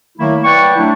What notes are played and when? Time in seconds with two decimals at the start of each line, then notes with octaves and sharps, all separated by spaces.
0.18 D#3 F#3 A3 A#3 E4
0.44 B4 D5 F#5 G5 C#6
0.76 F#3 A3 D4 E4